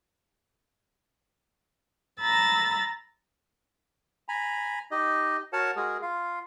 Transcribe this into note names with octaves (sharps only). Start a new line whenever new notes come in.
A#5 B5 E6 A6 A#6
G#5 A#5 B5
D#4 G4 D#5
F#4 A#4 C#5 F#5 A5
G#3 F#4 G#4 A#4
F4 F5